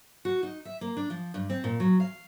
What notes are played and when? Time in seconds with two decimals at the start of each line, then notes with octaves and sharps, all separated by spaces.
0.25 F#4
0.43 D#4
0.65 E5
0.81 A#3
0.97 D4
1.10 F3
1.34 G2
1.50 C4
1.64 A#2
1.80 F#3
2.00 F5